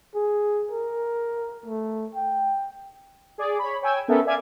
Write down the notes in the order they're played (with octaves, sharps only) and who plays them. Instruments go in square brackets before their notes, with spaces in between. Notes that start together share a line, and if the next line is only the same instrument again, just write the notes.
[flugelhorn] G#4
A#4
A3
G5
[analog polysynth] G#4 D5
C#5 B5
C#5 G5 G#5 E6 G#6
B3 C#4 A4 A#4 E5
D5 E5 F5 G#5 D6 G#6